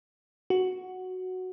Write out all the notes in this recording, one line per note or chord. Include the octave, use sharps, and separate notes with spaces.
F#4